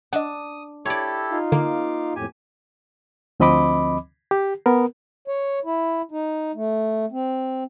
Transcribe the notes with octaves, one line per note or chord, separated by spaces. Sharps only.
D4 D#5 F#5 D#6
E4 G4 A4 C#5 D5
D#4 F4 F5
D3 A#3 D6
F2 A2 G4 G#5
D2 F3 C4 D#5 B5 D6
G4
B3 A#4
C#5
E4
D#4
A3
C4